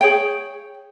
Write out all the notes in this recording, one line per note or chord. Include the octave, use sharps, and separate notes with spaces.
G#4 C#5 G5